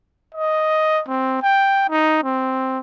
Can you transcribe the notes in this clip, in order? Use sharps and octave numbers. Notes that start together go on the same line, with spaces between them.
D#5
C4
G5
D#4
C4